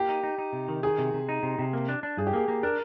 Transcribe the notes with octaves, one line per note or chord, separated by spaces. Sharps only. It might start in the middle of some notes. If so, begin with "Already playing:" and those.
Already playing: A#3 G4
D#4
D#4
D#4
C3
D#3
D#3 G#4
C3
C3
D#4
C3
C3
A#3
D4
D4
G2 G#4
G4
A#3 G#4
A#3
D4 A#4